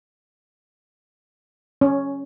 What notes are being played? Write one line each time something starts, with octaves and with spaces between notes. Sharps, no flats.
C#4